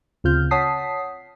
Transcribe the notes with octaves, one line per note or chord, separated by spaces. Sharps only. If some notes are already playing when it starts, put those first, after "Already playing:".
D2 C#3 C4 F4 F6 G6
C#5 F#5 A5 D#6 B6 C7